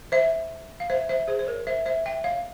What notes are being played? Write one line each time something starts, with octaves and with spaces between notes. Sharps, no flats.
C5 E5
F5
C5 E5
C5 E5
G#4 C5
C5
A#4 C#5
C5 E5
C5 E5
E5 G5
C#5 F5